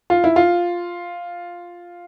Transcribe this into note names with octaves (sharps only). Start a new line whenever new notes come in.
F4
E4
F4